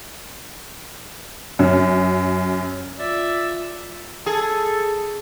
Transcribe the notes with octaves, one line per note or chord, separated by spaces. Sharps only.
F#2
F4 D5 E5
G#4 A4